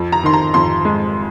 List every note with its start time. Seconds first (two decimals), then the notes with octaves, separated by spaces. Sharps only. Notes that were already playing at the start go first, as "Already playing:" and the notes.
Already playing: F2
0.12 A#5
0.23 D#3 C6
0.33 A#5
0.54 F2 C6
0.85 G#3